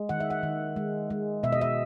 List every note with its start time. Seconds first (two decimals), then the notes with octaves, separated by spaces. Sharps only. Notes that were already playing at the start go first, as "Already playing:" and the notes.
Already playing: G#3
0.09 D#3 F#5
0.20 E5
0.30 F#5
0.43 D#3
0.76 G#3
1.10 G#3
1.43 B2 E5
1.53 D#5
1.61 E5